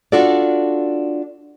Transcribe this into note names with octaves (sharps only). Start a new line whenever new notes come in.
D4 F4 F#4 A4 D5